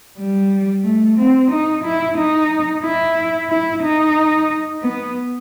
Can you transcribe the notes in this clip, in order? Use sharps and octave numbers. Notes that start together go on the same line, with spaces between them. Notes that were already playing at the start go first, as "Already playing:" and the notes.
G3
A3
C4
D#4
E4
D#4
E4
E4
D#4
B3